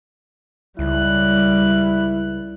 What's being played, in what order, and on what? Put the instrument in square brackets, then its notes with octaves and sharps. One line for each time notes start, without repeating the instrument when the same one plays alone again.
[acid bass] C#2 [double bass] G3 [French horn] E4 [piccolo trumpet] F#6